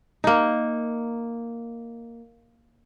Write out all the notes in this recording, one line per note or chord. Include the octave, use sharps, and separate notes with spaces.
A#3 D#4